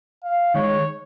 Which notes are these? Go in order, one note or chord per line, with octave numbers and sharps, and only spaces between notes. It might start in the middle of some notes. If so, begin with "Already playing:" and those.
F5
D#3 G#3 D#4 C#5